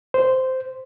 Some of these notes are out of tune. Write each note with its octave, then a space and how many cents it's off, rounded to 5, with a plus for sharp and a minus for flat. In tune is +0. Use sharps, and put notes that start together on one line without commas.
C5 -10